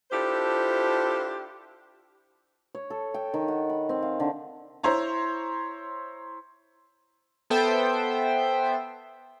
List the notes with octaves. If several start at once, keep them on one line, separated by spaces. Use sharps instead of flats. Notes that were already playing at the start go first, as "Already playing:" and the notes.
D4 E4 F4 G4 A4 C5
C#5
A4
G5
D#3
F#5
B5
C4
F5
D3
E4 C5 C#5 A#5
B3 A4 C5 E5 G5